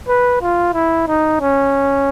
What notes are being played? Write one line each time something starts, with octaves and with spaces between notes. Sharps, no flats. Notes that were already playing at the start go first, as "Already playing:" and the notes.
B4
F4
E4
D#4
C#4